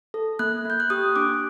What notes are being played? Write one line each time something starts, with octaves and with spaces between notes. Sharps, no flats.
A4
A#3 F#6
A#3 G6
F#6
G4 D#6
D4 D6